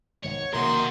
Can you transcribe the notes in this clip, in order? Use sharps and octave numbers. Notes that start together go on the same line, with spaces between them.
B1 G#2 D#3 C#5
B1 C3 D#3 A#3 F#4 A#4 C6